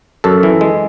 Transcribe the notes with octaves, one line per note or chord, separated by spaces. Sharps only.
F#2 A4
E3
G#3